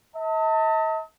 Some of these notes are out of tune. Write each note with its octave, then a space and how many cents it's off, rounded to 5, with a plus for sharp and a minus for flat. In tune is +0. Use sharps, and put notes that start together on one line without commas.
D#5 +45 A5 +35